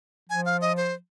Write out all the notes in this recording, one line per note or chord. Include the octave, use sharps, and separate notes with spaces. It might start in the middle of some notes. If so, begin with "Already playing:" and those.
F3 G#5
F5
D#5
C5